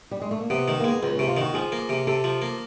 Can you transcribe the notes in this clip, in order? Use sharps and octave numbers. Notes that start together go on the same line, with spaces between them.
G3
G#3
A3
A#3
C3 B3
D#3 A3
G#3 A#3
B3
C#2 C4
C3 C#4
F4
D#3 F#4
F3 G#4
A#3
C3
C3 A4
F3
A#3